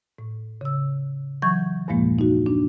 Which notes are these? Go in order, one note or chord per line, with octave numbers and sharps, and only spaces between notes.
A2
C#3 E6
E3 F#3 C#6 G6 G#6
E2 G2 A#2 F3 G#3 A#3
D#4 F#4
D4